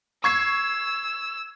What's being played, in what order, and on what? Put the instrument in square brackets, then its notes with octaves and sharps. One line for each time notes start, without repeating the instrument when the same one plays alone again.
[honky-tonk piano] C#6 G#6 C7 [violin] E6